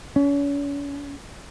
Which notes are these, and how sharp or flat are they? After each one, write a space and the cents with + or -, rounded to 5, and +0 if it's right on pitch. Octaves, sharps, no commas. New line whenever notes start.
C#4 +40